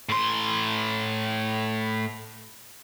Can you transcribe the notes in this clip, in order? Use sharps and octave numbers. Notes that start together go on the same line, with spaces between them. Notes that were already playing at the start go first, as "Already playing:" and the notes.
A2 C6